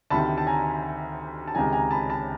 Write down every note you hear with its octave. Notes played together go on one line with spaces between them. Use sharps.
D2 C3 D#3 A5 B5
A5
G#5 A#5
A5
C#2 C3 D#3 G#5 A#5
G#5 A#5
A5 B5
A5 B5